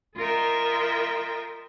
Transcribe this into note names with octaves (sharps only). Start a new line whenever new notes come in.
F4 A4 A#4 D#5 E5 G5